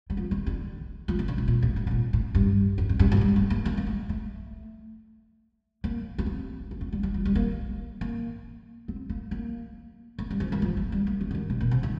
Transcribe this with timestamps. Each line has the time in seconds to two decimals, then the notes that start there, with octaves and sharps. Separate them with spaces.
0.10 G3
0.17 F3
0.31 D#3
0.46 D3
1.08 F3
1.19 D#3
1.28 D3
1.38 C3
1.48 A#2
1.63 A2
1.76 A2
1.87 C3
1.91 A#2
2.13 A2
2.35 G2
2.78 F2
2.89 G2
2.99 G2
3.12 A#2
3.17 A3
3.21 G3
3.36 A3
3.50 A#3
3.65 A#3
3.77 A#3
3.87 A3
4.09 A3
5.84 A#3
6.18 A#3
6.26 C4
6.71 A#3
6.81 A3
6.93 G3
7.03 G3
7.14 F3
7.25 G3
7.35 A#3
8.01 A#3
8.88 C4
9.09 A#3
9.31 A#3
10.19 A3
10.30 G3
10.40 F3
10.52 D#3
10.62 F3
10.77 A3
10.92 G3
11.07 A#3
11.21 A3
11.31 D3
11.35 D#3
11.50 C3
11.61 A#2
11.71 C3
11.83 D#3